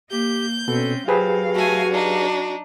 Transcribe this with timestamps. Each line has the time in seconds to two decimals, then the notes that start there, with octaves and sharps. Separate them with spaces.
0.10 A#3 G4 G6
0.68 B2 C4 C#4 A4
1.08 F#3 G4 G#4 B4 C5 F5
1.55 A3 F#4 G#5
1.91 D4 D#4